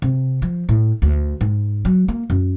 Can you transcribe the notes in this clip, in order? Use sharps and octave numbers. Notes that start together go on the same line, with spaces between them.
C3
F3
A2
D2
G#2
F#3
A#3
F#2